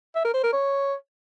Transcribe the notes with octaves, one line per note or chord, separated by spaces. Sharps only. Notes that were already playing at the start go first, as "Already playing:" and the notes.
E5
A#4
C5
A#4
C#5